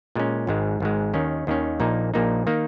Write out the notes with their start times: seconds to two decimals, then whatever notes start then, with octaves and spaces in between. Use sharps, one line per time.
0.16 A#2 G#3 C#4
0.47 G#1 G#2 G#3
0.80 G#1 G#2 G#3
1.13 D#2 D#3 C#4
1.47 D#2 D#3 C#4
1.80 A#1 A#2 A#3 D#4
2.14 A#1 A#2 A#3 D#4
2.47 D#3 A#3 D#4